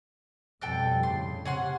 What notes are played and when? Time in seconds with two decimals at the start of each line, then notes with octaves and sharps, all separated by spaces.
0.62 F2 B2 G3 A4 G5 F#6
1.03 A2 C#3 C6
1.45 C3 C#4 F#5 C6